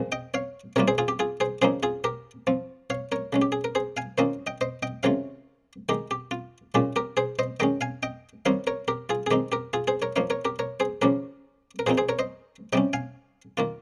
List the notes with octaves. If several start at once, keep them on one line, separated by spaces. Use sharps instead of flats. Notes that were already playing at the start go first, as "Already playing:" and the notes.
Already playing: A#2 F3 G#3 C4
D#5 G5
C#5 F5
C3 G3 A#3 F4 A#4 C#5
G#4 C5
F4 G#4
G4
F4 G#4
G#4 C5
C#3 F3 A#3 D#4 G#4 C5
F4 G#4
G4 A#4
F3 C4 F4
C#5 F5
A#4 C#5
C#3 G#3 C#4
G4
G#4
A#4
G#4 C5
F5 G#5
D#3 A#3 C#4 F4 C5 D#5
D#5 G5
C5 D#5
D#5 G5
C3 D#3 G#3 C#4 F4 C#5 F5
D#3 G#3 D#4 G4
G4
F4
A#2 G#3 C#4 F4 G4
G4 A#4
G#4 C5
C5 D#5
D#3 G#3 C#4 D#5 G5
F5 G#5
D#5 G5
D#3 G3 C4 D#4 C#5 F5
A#4 C#5
G4 A#4
F4 G#4
G#4
D#3 G#3 C4 D#4 G4
G4 A#4
F4 G#4
G#4 C5
A#4 C#5
F3 A#3 D#4 C#5 F5
A#4 C#5
G4 A#4
A#4 C#5
G#4 C5
C#3 F3 A#3 C#4 G4 A#4
A#4
A#2 F3 C4 D#4 G#4 C5
G#4 C5
A#4 C#5
C5 D#5
C3 G3 C#4 D#5 G5
F5 G#5
D#3 A#3 F4